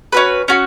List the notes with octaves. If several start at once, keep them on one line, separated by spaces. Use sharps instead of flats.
C#4 F#4 B4
C#4 F#4